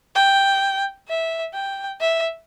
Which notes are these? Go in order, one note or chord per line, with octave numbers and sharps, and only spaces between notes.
G5
E5
G5
E5